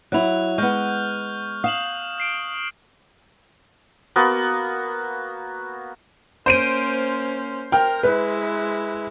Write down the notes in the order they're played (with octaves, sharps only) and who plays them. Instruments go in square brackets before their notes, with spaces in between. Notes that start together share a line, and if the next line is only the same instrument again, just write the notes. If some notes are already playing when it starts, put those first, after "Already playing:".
[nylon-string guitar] F#3 E4 [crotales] F#6 F7
[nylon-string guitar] G#3 B3 [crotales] C#6 F6 G6
[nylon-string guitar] F5 [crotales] D#6 E7 F#7
[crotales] F6 C7 D7
[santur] A#3 B3 F#4
[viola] A#3 C#4 [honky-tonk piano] C5 D7 D#7
[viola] A#4 [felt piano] G5 F6
[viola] G#3 E4 [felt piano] B4